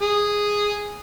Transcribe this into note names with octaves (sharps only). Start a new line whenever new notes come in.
G#4